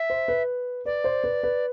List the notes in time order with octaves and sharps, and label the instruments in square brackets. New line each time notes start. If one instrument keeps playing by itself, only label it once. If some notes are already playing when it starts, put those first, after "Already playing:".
Already playing: [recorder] E5
[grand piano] C5
B4
[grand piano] B4 [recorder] D5
[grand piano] C5
B4
B4